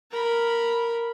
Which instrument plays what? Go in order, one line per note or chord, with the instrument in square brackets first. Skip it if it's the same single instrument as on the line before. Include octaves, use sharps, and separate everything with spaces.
[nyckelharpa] A#4 B5